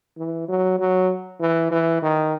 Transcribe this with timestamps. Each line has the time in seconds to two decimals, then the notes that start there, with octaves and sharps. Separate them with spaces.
0.17 E3
0.48 F#3
0.79 F#3
1.40 E3
1.71 E3
2.02 D#3